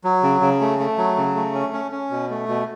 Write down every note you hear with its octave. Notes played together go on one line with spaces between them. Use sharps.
F#3
C#3
C#3
A3
A3
F#3
C#3
A3
C#4
C#4
C#4
B2
A3
B2